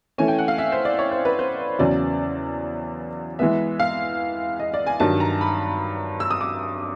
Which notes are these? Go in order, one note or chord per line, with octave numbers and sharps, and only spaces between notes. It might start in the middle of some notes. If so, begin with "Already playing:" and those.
E3 A3 C#4 G#5
G5
F#5
F5
E5
C5
D5
C#5
C5
B4
C5
E2 C#3 F#3 D5
E3 G#3 B3 E5
F5
D#5
D5
G#5
G2 D#3 F#3 A5
A#5
B5
E6
D#6
D6